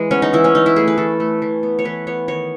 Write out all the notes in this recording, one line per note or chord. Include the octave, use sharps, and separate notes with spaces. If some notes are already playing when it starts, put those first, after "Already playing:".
Already playing: E3 G#3
B3 C#4
D#4
E3 E4
C#4
E3 D#4
E4
A3 G#4
B4
E3 A4
A3
E3
B3
C#5
E3 B4
B3 C#5
D#3 C#5